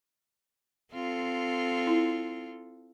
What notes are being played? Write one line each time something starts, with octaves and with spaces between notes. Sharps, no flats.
C4 F4 A4
E4